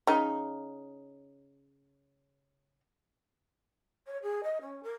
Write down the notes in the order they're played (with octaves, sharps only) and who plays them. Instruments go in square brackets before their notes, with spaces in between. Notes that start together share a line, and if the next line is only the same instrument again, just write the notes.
[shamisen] C#3 D#4
[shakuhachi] C#5
G#4
D#5
C#4
A#4